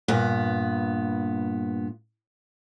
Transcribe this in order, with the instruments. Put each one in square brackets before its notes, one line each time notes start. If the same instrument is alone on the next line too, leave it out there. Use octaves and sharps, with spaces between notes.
[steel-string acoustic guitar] G2 A#2 B3